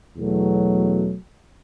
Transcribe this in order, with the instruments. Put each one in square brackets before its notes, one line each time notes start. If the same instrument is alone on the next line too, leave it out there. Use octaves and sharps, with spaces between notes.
[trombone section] E2 B2 F#3 A3